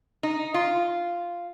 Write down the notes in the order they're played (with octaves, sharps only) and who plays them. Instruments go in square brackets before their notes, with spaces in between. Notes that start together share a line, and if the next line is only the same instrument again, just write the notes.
[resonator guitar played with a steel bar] D#4
F4